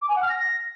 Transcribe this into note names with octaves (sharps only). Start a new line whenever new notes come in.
D6
G#5
F#5
F6
A#6